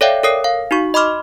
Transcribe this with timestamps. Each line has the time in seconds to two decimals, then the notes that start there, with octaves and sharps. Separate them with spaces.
0.01 A4 C#5 D5 E5 F5 G5
0.23 A4 A#4 C#5 D#6 C7
0.44 F5
0.71 D#4 F#4 C#6
0.94 D#5 B5 C6 D6 F6